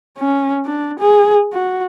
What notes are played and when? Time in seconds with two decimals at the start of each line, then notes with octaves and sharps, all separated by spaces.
0.18 C#4
0.66 D4
1.00 G#4
1.53 F#4